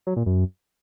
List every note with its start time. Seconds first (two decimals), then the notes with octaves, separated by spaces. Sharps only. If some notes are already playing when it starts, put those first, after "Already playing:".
0.07 F#3
0.16 A#2
0.26 F#2